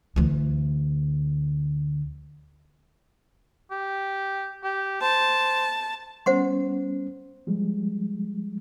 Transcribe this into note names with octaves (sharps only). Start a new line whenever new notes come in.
D2 E3
G4
G4
C5 A5
G3 B3 C#4 C5 F#5 C6
F3 G3 G#3